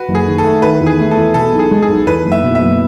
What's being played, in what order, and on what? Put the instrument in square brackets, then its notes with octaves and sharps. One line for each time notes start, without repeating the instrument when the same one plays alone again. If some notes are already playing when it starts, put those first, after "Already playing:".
Already playing: [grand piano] F#4 B4
[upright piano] F#1
[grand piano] G#4
[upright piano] D#3
[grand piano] A4
[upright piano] A3
[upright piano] D#3 [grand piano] B4
[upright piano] E2
[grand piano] G#4
[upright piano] A3
[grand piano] A4
[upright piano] E2
[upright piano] B2 [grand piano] A4
[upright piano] B1
[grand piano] G#4
[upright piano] G#3
[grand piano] G#4
[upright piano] B1
[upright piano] E2 [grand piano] B4
[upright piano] F#1
[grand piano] E5
[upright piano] B2
[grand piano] E5
[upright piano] F#1